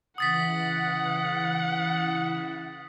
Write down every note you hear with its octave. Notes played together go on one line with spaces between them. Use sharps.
C#3 E3 E4 F#5 D#6 A6 B6